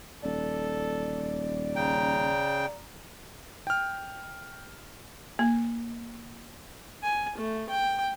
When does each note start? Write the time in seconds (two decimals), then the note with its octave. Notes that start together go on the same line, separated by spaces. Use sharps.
0.23 D#1 A4 D5
1.76 C#3 G5 A#5
3.67 G5 F6
5.39 A#3
7.03 G#5
7.38 A3
7.69 G5